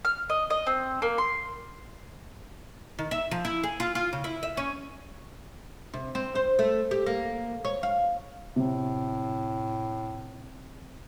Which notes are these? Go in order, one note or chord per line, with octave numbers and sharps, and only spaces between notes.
F6
D#5
D#5
C4
A#3
C6
D#3
E5
F3
E4
G#4
F4
F4
C#3
E4
E5
C#4
C3
C4
C5
A3
G4
A#3
C#5
F5
A2 C3